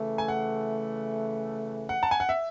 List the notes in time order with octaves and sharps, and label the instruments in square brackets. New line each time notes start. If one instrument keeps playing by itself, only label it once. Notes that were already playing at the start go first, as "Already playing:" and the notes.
Already playing: [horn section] C#3 E3 A3
[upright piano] G#5
F#5
F#5
A5
G#5
F#5
E5